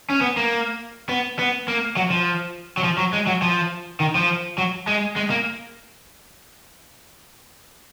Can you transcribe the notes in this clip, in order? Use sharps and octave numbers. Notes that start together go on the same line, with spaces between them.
C#4
B3
A#3
B3
B3
A#3
F#3
F3
F#3
F3
F#3
G#3
F#3
F3
D#3
F3
F#3
G#3
G#3
A#3